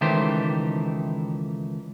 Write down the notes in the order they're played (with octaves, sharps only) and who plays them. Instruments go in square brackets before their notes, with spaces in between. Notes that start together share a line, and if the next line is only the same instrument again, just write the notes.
[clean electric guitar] C#2 D#3 E3 A3 G4 C5